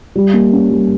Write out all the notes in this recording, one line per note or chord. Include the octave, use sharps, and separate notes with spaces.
G3
A#3
C#4
G3